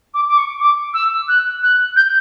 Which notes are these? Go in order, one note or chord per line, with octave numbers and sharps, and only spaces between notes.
D6
D6
C#6
D6
E6
F#6
F#6
G6